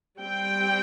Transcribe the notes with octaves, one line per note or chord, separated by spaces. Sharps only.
G3 C4 G5